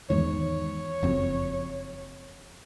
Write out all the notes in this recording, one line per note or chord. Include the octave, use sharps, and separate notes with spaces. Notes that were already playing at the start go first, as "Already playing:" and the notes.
E2 G#2 D#3 C#5
F#1 F2